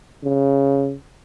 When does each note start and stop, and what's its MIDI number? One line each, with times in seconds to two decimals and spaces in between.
0.24 0.95 49